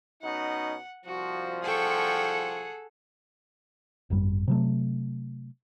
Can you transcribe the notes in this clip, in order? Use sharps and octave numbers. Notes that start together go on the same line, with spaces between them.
B2 C#4 D#4 F#5
C2 F3 F#4
G#4 A4 F#5 G5 C#6
G#1 F#2 G3
C3 F#3 A3